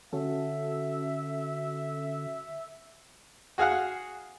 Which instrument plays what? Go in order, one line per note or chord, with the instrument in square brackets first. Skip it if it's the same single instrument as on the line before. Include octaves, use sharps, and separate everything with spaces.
[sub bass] D3 [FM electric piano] C#4 F#4 A4 [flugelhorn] E5
[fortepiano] F#4 G#4 F5 F#5